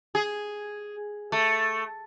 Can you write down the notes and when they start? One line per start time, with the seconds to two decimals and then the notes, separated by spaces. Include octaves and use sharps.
0.15 G#4
1.32 A3